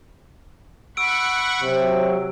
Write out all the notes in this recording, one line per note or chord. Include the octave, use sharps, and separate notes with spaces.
F#5 B5 C#6 E6 D7
C3 F#3